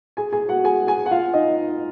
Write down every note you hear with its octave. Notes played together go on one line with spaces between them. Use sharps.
G#4 G#5
G#4 G#5
F#4 F#5
G#4 G#5
G#4 G#5
F#5
F4 F5
D#4 D#5